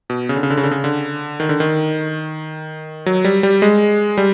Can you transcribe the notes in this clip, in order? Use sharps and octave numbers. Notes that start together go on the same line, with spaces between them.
B2
C#3
D3
C#3
D3
C#3
D3
C#3
D3
D#3
D3
D#3
F#3
G3
G3
G#3
G3